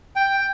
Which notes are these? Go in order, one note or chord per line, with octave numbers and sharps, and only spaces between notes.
G5